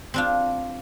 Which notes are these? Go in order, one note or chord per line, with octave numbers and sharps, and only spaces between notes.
C4 D4 F4